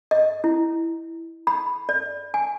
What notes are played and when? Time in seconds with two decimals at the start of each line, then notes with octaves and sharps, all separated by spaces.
0.11 D#5
0.44 E4
1.47 B5
1.89 D5
2.34 G#5